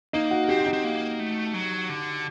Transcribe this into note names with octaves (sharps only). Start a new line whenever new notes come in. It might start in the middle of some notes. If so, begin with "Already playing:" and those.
A#3 D#4
F#4
C4 G4
F#4
D#4
C4
A#3
A3
F#3
D3